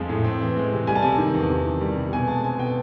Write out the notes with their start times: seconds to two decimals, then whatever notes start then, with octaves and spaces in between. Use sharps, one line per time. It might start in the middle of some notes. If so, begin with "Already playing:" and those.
Already playing: F2 F3 G#3 C4
0.09 A2
0.24 C4
0.41 E3
0.57 G#3
0.72 C3
0.87 G3 G#5
0.95 A5
1.02 C3 G#5
1.18 D#3
1.34 E2
1.49 C3
1.65 D#3
1.81 G3
1.96 C3
2.13 B2 G#5
2.28 G#3 A5
2.44 C4 G#5
2.59 B2 G5